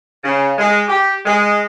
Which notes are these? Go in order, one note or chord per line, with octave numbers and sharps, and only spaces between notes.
C#3
G#3
G4
G#3